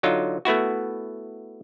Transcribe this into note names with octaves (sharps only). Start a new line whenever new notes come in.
D3 F#3 D#4 F4
A3 B3 E4 F#4